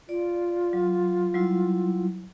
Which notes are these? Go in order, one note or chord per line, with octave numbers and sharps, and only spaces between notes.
F4 D5
F#3
F#3 G3 E4